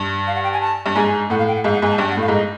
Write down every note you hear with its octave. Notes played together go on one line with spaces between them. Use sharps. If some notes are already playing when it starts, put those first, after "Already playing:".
Already playing: G2
F5
F#5
G5
G#5
A5
G2
G#2 G#5
A2 F#5
F5
G5
F#5
G#2 F5
F#5
G#2 G#5
A5
G2 G5
F#5
A2 F5
G#2 D#5